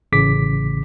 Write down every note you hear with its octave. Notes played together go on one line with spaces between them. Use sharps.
A1 C#3 D6 B6